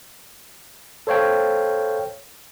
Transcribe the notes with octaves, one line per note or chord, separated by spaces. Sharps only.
A4 C5 C#5 F5 G5